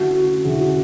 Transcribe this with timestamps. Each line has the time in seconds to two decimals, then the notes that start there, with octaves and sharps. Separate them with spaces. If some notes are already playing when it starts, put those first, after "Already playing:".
Already playing: D3 A3 C#4 E4 F#4
0.45 D3 A3 C#4 E4 G#4
0.60 F#4